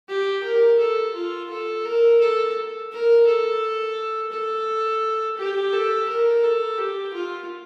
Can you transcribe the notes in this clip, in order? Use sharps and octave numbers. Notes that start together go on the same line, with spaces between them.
G4
A#4
A4
F4
A4
A#4
A4
A#4
A4
A4
G4
A4
A#4
A4
G4
F4